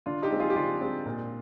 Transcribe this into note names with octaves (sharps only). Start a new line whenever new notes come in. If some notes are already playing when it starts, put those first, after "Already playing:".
D3 D4 F4
D#4 G4
G#3 C4
F4 G#4
G4
D3 D4 F4
G#3 C4
A#2